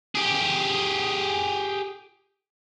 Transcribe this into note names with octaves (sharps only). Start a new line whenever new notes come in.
G4 G#4